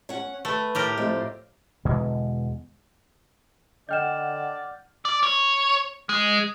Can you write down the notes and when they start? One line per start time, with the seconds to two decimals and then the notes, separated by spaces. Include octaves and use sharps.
0.09 C#4 F#5
0.45 A3 B4
0.75 A2 G4 A#4
0.98 F2 A3 C4
1.85 E2 B2 D3 G#3
3.89 D3 D5 D#5 F#5 G5 F6 G6 E7
5.05 D5
5.23 C#5
6.09 G#3